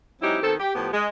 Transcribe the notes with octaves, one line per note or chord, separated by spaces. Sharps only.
F#3 G#3 C4 D#4 E4 G4
B2 D#3 C4 A4
G4
A2 F3 B3 G4
G#3